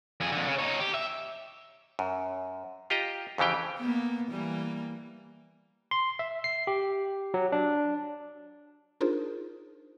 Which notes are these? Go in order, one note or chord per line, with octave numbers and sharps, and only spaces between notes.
F2 G#4
F2 D3
C#3
D#4 C#5
G4
E5
F#2
F4 G4 D#5 A#5
F2 C#3 E3 G4 G5
A#3 B3
E3 G3 A#3
C6
E5
C7
G4
F#3
D4
D4 D#4 F4 G#4 A#4 C5